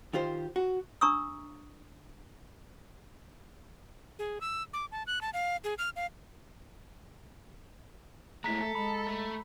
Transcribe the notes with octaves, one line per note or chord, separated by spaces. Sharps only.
D#3 F4 G4 C5
F#4
D4 A#5 C#6 D#6 E6
G#4
E6
D6
A5
F#6
A5
F5
G#4
F6
F5
G#3 A3 E4 A#5 B6
A4
G#3 B5
A3